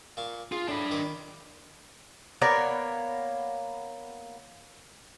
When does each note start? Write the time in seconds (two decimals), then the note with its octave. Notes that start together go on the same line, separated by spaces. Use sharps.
0.17 A#2 F5 C#6
0.52 F4 G#4
0.68 A2 D4 B5
0.91 D#3 C6 D6
2.42 A#3 B3 C#5 D5